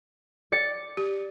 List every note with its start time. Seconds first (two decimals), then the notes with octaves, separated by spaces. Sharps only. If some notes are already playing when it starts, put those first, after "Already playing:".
0.52 D5 A6 C#7
0.97 G4